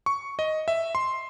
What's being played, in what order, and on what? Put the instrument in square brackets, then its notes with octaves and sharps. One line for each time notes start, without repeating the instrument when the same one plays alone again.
[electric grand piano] C#6
D#5
E5
C6